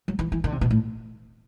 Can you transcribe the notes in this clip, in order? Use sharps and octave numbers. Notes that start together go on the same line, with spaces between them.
F#3
E3
E3
D3
C3
B2
A2